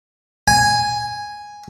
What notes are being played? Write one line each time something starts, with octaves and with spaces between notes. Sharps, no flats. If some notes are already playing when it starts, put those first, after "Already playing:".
G#5